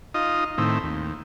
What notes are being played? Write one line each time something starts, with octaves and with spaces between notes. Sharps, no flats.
D#4 F4 D#5
A2 D#3 C4 E4
D#2